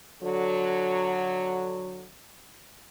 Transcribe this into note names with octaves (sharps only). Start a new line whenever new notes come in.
D3 F#3